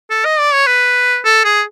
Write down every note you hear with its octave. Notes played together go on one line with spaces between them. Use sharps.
A4
D#5
D5
C#5
B4
A4
G#4